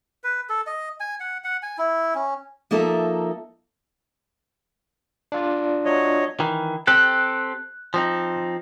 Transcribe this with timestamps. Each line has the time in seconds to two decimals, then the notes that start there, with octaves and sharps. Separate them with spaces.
0.24 B4
0.49 A4
0.67 D#5
1.00 G#5
1.20 F#5
1.44 F#5
1.63 G#5
1.78 E4
2.15 C#4
2.71 F3 A#3 D#4 A4 E5
5.32 D4 F4 D5
5.85 F#3 C#5 D#5
6.40 D#3 E3
6.87 C4 G4 A4 F#6
7.94 F3 C4 D#4